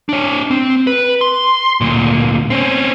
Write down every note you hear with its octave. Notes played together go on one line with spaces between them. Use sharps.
D4 C#5
C4
B4
C6
D2 A#2
C4 C#4